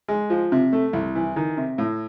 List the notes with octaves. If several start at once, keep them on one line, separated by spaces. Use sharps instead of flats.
G#3
F3
C3
A3
C2
E3
D#3
C3
A2